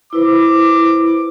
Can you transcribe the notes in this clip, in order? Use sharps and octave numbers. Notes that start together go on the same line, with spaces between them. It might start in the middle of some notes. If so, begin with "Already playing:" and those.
E4 B4 C5 D6